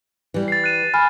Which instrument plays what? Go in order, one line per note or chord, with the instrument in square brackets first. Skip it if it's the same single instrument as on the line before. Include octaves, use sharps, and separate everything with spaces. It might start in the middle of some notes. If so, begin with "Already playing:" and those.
[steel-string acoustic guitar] E3 G3
[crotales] A6 C7
F#6 D#7 E7
[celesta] G#5 B5 F6